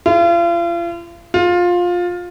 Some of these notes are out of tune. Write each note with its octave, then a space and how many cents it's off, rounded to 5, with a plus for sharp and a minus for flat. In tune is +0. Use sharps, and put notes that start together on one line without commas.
F4 -40
F4 +15